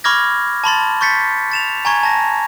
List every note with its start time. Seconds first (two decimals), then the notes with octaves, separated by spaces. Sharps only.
0.04 B5 C#6 D6 F6 G#6 A#6
0.64 A5 B5 C6 A6
1.01 C#6 G6 A6 B6 C#7
1.52 A6 E7 F7
1.85 G#5 A#5 C#6 G#6
2.03 A5 A#6